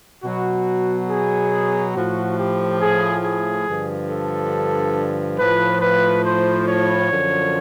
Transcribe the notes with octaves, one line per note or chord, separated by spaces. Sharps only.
B2 F#3 F#4
G#4
A2 F3 F#4
G4
G#4
G#4
G2 D3 F3
A4
A2 F3 B4
B4
C5
C#5
F#2 D3 F3